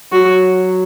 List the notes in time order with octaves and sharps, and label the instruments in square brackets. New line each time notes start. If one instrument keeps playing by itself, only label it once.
[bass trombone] F#3 [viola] F#4